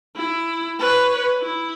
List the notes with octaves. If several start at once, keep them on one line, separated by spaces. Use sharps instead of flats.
E4
B4 C#5
E4